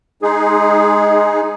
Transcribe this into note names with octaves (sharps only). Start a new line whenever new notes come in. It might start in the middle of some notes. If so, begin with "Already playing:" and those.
G#3 D#4 G#4